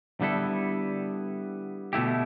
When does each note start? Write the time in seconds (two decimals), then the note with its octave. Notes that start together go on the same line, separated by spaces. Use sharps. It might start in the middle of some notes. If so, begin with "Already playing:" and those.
0.21 D3 G3 B3 E4 A4
1.93 B2 A3 E4 G4